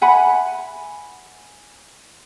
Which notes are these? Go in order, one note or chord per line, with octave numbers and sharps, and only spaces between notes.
E5 F#5 G#5 B5